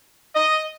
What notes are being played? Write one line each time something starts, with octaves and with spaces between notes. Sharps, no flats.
D#5